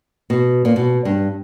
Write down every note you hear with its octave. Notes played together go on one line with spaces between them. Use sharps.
B2
A#2
B2
G2